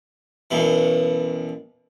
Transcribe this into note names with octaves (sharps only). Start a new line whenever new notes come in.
B1 F#2 B2 E3